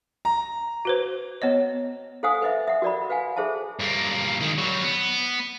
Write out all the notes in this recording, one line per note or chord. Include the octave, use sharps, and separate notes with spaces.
A#5
F#4 B4 C5
B3 C#5 D#5
A4 C5 F5 F#5 G#5 D#6
A4 B4 C5 D#5 E5
E5 F#5
F#4 A#4 D5 D#5 B5
B4 F5 F#5 G#5
G#4 A4 C5 E5 A5
G2 A#3
D#3 G#3
F#3 G3
B3